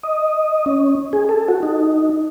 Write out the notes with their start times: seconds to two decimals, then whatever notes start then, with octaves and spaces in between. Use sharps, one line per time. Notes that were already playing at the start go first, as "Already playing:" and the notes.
0.03 D#5
0.66 C#4
1.13 G#4
1.29 A4
1.48 F#4
1.63 D#4